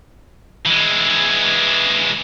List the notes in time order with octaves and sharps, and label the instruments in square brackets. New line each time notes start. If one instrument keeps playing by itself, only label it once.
[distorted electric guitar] E3 G#3